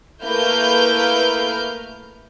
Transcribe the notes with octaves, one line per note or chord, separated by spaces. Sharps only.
A3 A#3 E4 B4 F6 G6